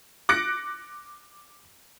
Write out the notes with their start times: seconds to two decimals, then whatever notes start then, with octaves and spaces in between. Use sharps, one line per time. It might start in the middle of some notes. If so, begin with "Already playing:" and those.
0.29 D6 F#6 A#6 C#7 D7